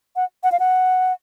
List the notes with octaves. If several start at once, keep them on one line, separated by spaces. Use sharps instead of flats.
F#5
F#5
F5
F#5